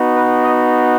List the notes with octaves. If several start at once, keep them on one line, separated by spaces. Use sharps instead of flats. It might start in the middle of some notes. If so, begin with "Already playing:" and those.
Already playing: B3 D#4 F#4
B4
D#5